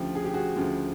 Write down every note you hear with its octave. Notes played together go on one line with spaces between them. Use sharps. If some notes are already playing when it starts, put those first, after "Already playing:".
Already playing: D2 C#3 F3 G4
G#4
G4
F#4 G#4
D2 C#3 F3